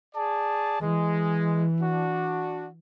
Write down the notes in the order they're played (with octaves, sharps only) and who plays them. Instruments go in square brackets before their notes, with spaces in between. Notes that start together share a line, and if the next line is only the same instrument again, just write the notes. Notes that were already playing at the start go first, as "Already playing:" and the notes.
[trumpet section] G#4 D5 A5
[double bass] E3 [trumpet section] G#3
[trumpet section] D4 F#4